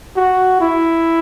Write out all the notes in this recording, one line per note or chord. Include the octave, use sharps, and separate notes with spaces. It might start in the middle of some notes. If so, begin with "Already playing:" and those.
F#4
E4